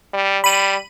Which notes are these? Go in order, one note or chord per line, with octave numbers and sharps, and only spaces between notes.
G3
G3 B5 D#7